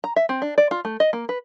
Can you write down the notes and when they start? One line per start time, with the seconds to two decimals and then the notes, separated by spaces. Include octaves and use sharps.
0.04 A#5
0.16 E5
0.29 C4
0.42 D4
0.58 D5
0.71 F4
0.85 A3
1.00 D#5
1.13 A#3
1.29 B4